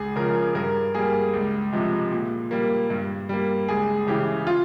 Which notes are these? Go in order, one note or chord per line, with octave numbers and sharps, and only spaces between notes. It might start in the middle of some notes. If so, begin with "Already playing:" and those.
Already playing: C#2 G#4
C#3 F3 A#4
G2 A#4
G3 A#3 G#4
C#2
C3 F3 G#3
A#2
G3 A#3
G2
G3 A#3
C#2 G#4
C#3 E3 G4
F4